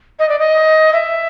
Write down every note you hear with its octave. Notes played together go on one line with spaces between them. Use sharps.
D#5
D5
D#5
E5